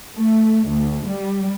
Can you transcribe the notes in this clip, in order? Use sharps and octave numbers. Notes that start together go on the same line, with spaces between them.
A3
D2
G3